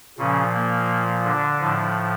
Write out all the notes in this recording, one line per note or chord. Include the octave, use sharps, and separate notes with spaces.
A#2 C#3 F3 C#4
A#3
D3 D4
A2 F3